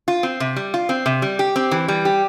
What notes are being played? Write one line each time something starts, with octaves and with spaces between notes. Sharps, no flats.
F4
C4
C3
G3
F4
C4
C3
G3
G4
C4
E3
G3
G4